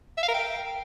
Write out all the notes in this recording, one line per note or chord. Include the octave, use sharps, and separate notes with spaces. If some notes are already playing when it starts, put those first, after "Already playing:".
E5
F5
A#4
G5